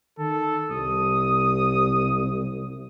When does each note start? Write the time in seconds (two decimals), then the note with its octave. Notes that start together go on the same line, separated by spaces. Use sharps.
0.19 D#3 A4
0.70 C2 D#6